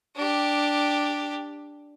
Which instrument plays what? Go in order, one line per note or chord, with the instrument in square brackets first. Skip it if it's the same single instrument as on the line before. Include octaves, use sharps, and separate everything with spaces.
[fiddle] D4 G4